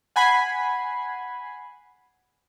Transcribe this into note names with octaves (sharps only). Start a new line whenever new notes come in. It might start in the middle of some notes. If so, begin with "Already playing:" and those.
F#5 G#5 B5 G#6 C7